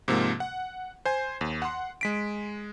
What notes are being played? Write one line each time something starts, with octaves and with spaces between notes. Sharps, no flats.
G#2 C3 F3 A#3
F#5
C5 G#5
D#2
F#5 C6
G#3 B6 D7